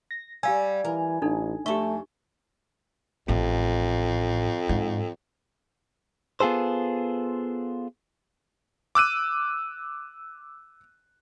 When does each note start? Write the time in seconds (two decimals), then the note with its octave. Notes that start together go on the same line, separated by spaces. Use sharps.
0.11 A#6
0.43 G3 G4 F5 G#5 E6
0.85 E3 A#4
1.22 A1 D4 D#4 A4
1.66 F2 A3 G4 E5 C#6
3.28 A1 F2 A2
4.69 G#2
6.40 B3 F4 G#4 A4 C5
8.95 D6 E6 F#6 D#7